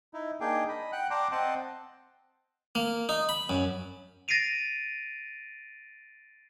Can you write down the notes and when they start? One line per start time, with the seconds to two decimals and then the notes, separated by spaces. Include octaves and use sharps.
0.14 D#4 E4
0.40 A#3 D4 D#4 G#4 G5
0.69 D#5 B5
0.92 F#5 G5 F#6
1.10 D5 G5 A5 A#5 C6 D6
1.32 C4 D#5 F#5 G5 A5 C6
2.75 A#3
3.09 D#4
3.29 B5
3.49 F#2
4.28 A6 A#6 C7 D7 D#7 F7